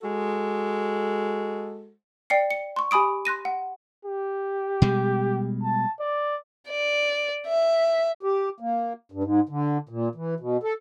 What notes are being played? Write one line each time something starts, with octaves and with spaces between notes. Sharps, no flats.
G#3 F#4 A4
D5 G5 C7 C#7
C#7
C6 C#6
G4 G#5 B5 D#6 D7
C6 F#6 A#6 D#7
F#5
G4
B2 G3 G#3
A5
D5
D5
E5
G4
A#3
G2
G#2
D3
A#2
E3
B2
A4